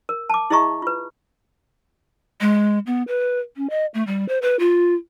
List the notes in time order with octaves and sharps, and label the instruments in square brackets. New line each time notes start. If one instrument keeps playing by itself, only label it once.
[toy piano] A#4
A5 D6
E4 G#4 D#5 E5 A#5 C#6
F4 B4
[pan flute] G#3
B3
B4
C#4
D#5
A3
G3
C5
B4
F4